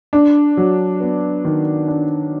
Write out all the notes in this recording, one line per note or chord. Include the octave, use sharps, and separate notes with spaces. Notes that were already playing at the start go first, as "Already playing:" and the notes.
D4
F#3
B3
D#3
D4